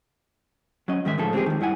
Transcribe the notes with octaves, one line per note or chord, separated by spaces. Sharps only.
F#3 C#4 D#5
G#2 D#3 G#3 E5
A2 D3 F3 G#4 A4
G#3 C4 F4 G4 G#4
E2 D#3
G2 E4 F#5 G#5